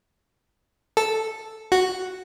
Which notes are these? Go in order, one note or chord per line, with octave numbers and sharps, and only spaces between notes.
A4
F#4